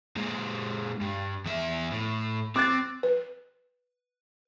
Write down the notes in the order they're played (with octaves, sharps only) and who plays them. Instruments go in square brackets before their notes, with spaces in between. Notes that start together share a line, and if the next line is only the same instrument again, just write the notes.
[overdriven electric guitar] A#2 G#3
G2
E2 E5
A2
[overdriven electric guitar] C4 [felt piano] D6 F#6 A6
[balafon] B4